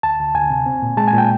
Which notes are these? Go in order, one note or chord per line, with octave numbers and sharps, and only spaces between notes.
D2 A5
D2
D2 G#5
C3
C4
A#2
G#3 A5
G#5
A#2 G5